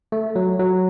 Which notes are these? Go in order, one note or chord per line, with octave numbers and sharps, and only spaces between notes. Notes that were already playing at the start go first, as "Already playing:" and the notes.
A3
F#3
F#3